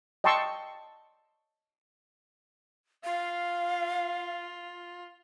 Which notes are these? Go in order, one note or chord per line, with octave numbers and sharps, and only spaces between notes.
D#5 G5 A5 C6 C#6 E6
F4 F5